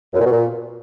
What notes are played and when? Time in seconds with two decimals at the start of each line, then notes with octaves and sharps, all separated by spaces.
0.14 F#2
0.20 A#2
0.26 B2
0.32 A#2